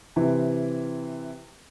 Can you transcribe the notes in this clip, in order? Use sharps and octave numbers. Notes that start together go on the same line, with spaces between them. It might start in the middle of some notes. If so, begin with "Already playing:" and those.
C3 E3